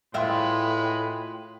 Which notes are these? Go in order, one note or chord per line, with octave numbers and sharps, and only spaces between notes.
A2 G#3 F4 B4 E5 G5 C6